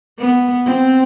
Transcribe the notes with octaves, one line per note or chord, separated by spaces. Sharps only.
B3
C4